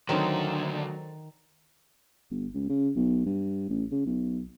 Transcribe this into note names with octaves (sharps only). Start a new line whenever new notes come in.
D2 D3 D#3 F#3 C4 A4 C5
G1
C#2
C#3
B1
G2
A1
C#3
B1